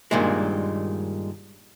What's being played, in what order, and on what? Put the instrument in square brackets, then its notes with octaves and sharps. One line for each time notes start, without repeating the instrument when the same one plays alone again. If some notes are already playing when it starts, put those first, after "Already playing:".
[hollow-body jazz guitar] G2 A#2 D#3 G#3